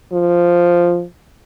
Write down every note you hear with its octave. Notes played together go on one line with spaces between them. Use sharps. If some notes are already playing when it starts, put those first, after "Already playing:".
F3